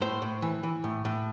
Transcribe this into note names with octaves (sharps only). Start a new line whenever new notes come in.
A2 C5
A2
E3
E3
A2
A2